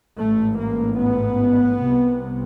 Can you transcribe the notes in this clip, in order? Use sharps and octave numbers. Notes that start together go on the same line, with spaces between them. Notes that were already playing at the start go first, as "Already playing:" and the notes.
A1 G#2 A3
A#3
B3
C2 C3